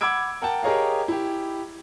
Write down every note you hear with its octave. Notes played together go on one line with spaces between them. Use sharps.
F#5 B5 D6 E6 G#6 D7
A#4 F#5 G5 A5
G4 G#4 A#4 C#5 D#5 F5
E4 G4